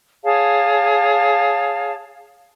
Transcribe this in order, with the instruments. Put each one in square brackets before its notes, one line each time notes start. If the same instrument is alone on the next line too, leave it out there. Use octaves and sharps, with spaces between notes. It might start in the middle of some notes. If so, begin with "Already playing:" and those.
[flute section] G#4 C#5 F5 A5